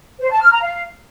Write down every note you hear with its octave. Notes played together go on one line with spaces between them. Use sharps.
C5
A5
F6
A#5
F5